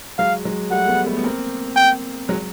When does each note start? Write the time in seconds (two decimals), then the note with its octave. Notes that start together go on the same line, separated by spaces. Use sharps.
0.18 F#3 G#3 F5
0.45 F#3 G#3
0.71 G3 A3 F#5
0.88 A3 B3
1.06 A3 B3
1.17 B3
1.24 A#3 C4
1.76 G5
2.29 F#3 G#3